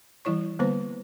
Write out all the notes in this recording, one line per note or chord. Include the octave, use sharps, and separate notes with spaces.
E3 G3 E4 C#5 C#6
D3 G3 A#3 B3 B4 C5